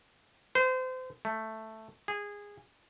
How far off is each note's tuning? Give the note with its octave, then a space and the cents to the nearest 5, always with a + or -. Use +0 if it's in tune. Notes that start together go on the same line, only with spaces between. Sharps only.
C5 -30
A3 +5
G#4 -20